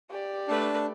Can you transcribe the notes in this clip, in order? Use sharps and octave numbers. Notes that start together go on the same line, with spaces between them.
G4 D5
A3 D4 B4